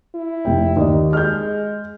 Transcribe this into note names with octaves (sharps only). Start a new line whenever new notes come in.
E4
F1 G5
D#2 D#3 D5 D#5
G#3 F6 G6